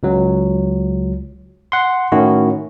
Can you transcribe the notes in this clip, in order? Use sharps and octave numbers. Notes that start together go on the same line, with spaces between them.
C#2 F#3
F#5 C6
A2 D#3 C#4 E4 F#4